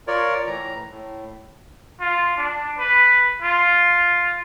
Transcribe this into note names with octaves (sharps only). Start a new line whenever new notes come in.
F4 A#4 C#5 D5
A2 E3 A#5
A2
F4
D4
B4
F4